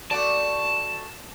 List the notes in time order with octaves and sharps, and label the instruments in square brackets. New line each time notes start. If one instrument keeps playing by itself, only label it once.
[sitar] A3 F#4 D5 [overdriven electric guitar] A5